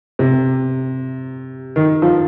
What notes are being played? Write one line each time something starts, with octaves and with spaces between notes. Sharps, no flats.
C3
D#3
F3